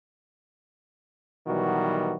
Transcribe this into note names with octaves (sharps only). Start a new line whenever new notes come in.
B2 D#3 E3 F#3 G3 F#4